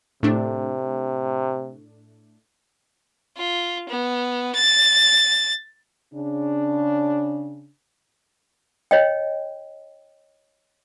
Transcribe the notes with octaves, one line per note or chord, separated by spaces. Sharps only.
A2 C3 A3 D4
F4
B3
A6
C#3 D4
C#5 D#5 G5